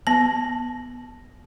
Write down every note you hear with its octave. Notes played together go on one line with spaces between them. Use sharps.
B3 A5